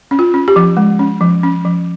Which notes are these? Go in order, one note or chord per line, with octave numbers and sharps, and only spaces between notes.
C#4
F4
C#4
G4
F3
G#3
C#4
F3
C#4
F3